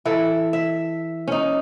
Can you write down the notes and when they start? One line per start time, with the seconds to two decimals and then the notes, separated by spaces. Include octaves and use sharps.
0.05 E3 E4 A4
0.53 E5
1.27 C#4 D#4